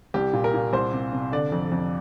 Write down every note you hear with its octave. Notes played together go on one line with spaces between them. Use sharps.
C2 G4
A#2
A#4
A#2
C2 C5
C3
C3
D3 D5
F2
F2